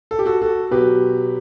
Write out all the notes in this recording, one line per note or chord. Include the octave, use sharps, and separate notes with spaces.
A4
G4
F#4 A4
F#4 A4
B2 F#3 G4 B4